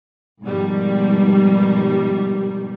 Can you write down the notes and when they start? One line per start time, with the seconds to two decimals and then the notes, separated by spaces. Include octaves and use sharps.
0.42 G#2 B2 D#3 F3 G3